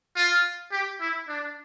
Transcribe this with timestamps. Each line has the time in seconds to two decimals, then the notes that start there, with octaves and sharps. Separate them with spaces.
0.16 F4
0.72 G4
1.01 E4
1.28 D4